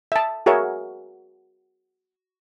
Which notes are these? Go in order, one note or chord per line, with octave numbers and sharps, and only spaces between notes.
E5 A5
F#4 G#4 A#4 C#5 E5